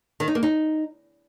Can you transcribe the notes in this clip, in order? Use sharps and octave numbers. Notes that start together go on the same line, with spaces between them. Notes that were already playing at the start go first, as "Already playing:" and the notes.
D#3
D#4
A#3
D#4